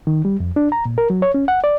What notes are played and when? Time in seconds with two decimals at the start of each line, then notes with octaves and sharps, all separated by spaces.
0.07 D#3
0.25 G3
0.40 F2
0.56 D4
0.72 A#5
0.85 A#2
0.98 A#4
1.10 F#3
1.22 C#5
1.34 C#4
1.48 F#5
1.64 D5